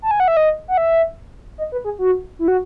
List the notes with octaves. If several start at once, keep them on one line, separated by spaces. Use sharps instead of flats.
A5
G#5
F#5
E5
D#5
F#5
E5
D#5
B4
G#4
F#4
E4
F#4